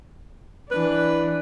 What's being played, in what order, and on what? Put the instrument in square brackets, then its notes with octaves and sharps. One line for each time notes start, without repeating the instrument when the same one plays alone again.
[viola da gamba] E3 D4 [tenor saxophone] B4